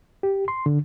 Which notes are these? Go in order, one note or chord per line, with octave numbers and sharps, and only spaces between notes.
G4
C6
D3